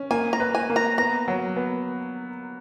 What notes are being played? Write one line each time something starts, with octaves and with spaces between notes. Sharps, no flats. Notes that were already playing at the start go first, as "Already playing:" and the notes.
Already playing: C#4
A#3 G#5
A#5
B4
G#5
A#3
A#5
B3 A#5
F#3
B3